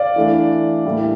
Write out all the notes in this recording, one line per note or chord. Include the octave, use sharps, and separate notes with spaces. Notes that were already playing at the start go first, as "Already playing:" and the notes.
Already playing: D5 F5
E3 A3 D4
A2 G3 A#3 D4